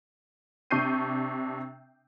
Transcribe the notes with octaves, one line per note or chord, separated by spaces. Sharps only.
C3 D4 C#6 G6 C7 D#7